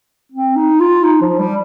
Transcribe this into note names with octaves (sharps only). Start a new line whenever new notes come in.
C4
D#4
F4
D#4
F3
G3